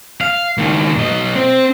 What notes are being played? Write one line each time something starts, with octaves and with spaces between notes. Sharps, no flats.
F5
C#2 D#3
B1 D#5
C4